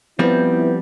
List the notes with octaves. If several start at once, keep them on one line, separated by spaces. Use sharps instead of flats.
F3 G3 B3 C4 E4